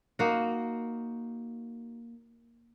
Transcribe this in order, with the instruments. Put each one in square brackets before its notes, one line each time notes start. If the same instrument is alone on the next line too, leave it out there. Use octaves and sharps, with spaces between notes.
[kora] A#3 D#4 F#4